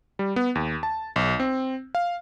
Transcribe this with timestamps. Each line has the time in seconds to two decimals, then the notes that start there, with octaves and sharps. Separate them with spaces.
0.19 G3
0.36 B3
0.55 D#2
0.83 A5
1.16 B1
1.40 C4
1.95 F5